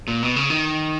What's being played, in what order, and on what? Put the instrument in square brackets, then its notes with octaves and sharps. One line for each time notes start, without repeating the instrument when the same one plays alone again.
[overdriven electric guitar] A#2
B2
C#3
D#3